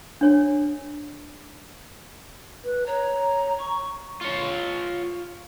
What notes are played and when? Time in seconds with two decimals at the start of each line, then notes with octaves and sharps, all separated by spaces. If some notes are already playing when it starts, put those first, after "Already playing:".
0.21 D4 C#5 G#5
2.64 B4
2.87 C#5 A#5
3.59 C#6
4.21 F4 C#5